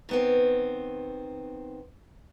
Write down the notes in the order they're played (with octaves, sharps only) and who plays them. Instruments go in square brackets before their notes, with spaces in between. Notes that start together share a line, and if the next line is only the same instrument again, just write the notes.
[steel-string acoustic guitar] D#3 B3 C4